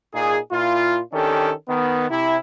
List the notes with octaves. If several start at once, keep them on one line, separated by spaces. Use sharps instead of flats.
A#2 D#4 G#4
A#2 E4 F4
D#3 C#4 D4 G4 A4
D#3 B3
C3 E4